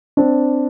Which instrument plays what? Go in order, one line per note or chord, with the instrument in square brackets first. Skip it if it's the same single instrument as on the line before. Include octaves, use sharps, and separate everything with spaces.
[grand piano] C4 D4